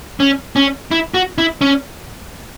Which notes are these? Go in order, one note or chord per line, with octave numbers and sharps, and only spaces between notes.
C#4
C#4
E4
F#4
E4
C#4